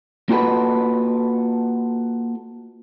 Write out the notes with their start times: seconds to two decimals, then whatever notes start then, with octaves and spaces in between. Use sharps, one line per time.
0.29 A#3 F4 F#4 A4 B4